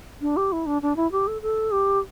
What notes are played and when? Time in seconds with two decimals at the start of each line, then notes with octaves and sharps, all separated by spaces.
0.21 D4
0.37 G4
0.52 E4
0.66 D4
0.82 D4
0.96 E4
1.12 G4
1.27 A4
1.42 A4
1.72 G4